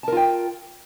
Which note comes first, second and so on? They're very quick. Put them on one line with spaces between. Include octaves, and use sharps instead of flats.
A5 A#4 F4 G5